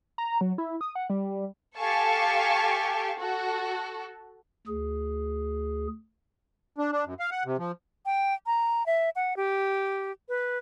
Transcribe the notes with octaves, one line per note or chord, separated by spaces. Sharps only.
A#5
F#3
E4
D#6
F#5
G3
G4 A4 F5 G#5 A5 C#6
F#4 A4
D2 G#4
D4
D4
F#2
F5
F#5
C3
F3
G5
A#5
E5
F#5
G4
B4